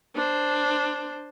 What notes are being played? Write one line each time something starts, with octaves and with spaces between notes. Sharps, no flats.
D4 C5